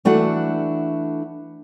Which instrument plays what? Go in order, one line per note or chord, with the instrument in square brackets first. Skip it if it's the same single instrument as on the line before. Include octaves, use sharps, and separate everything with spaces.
[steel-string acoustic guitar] E3 A3 D4 E4 F#4 F#5